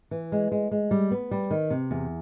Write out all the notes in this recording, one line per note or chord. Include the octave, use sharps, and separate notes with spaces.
E3
G#3
G#3
G#3
G3
B3
G3
D#3
C3
E2